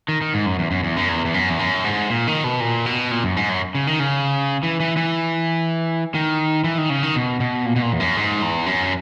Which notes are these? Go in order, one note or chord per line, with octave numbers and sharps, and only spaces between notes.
D#3
D#3
G#2
F#2
E2
F#2
E2
F#2
E2
E2
F#2
E2
F#2
G#2
A#2
D#3
B2
A#2
B2
A#2
F#2
G#2
F#2
C#3
D#3
C#3
E3
E3
E3
D#3
E3
D#3
C#3
D#3
B2
B2
A#2
B2
A#2
E2
F#2
G#2
E2
F#2